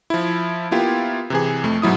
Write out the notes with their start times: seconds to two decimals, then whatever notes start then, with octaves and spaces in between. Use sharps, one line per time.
0.10 F3 E4
0.71 A#3 B3 E4 F4 G4
1.30 C3 E3 G#4
1.64 F2 A3
1.82 G#2 B2 F#3 E4 D#6